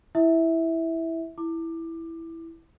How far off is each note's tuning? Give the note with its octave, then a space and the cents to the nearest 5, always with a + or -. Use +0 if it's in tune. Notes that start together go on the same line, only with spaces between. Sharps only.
E4 +0 E5 -15
E4 +0 D6 +20